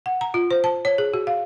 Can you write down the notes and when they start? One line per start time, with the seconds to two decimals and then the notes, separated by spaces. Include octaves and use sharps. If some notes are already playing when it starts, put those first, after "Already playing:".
0.06 F#5
0.21 A#5
0.34 F4
0.51 C5
0.64 A5
0.85 C#5
0.98 G#4
1.14 F#4
1.27 F5